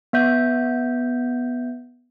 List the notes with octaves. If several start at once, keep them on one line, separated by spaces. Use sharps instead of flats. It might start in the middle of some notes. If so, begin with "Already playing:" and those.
B3 E5 G6